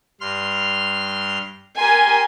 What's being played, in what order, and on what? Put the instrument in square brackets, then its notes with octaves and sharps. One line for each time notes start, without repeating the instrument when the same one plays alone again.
[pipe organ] G2 C6 F6
[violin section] G4 A#4 G#5 [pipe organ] C6